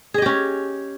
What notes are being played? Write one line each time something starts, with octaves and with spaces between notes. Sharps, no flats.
C#4 G4 G#4 D#5